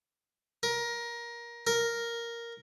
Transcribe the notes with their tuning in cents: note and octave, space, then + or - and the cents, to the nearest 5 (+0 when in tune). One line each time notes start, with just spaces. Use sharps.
A#4 +20
A#4 +0